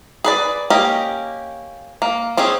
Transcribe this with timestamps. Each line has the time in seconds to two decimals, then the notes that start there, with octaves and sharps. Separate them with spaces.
0.24 G#4 B4 D5
0.70 A#3 C#4 G4 D#5
2.02 A#3
2.37 C4 C#4 D#4 G#4